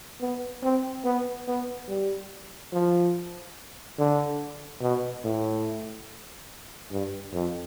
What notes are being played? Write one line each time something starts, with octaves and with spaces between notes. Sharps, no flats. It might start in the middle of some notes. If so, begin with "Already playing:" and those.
B3
C4
B3
B3
G3
F3
D3
B2
A2
G2
F2